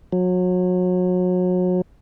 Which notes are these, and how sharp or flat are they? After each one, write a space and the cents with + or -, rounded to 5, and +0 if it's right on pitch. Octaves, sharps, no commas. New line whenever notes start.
F#3 -30